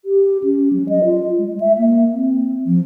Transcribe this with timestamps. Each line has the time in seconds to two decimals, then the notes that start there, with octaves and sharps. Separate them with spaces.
0.05 G4
0.44 C#4
0.73 F#3
0.89 D#5
1.05 F4
1.38 G#3
1.60 E5
1.78 A#3
2.13 C4
2.66 F3